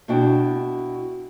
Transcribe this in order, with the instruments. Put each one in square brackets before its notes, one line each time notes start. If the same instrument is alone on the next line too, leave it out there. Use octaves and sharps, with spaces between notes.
[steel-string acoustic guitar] B2 D4 E4 F#4 G5